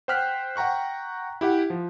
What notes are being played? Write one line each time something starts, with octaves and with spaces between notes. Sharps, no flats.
C5 F#5 G5 F6 F#6 B6
F#5 G5 A#5 C#6 F#6
E4 G4 F#5
F3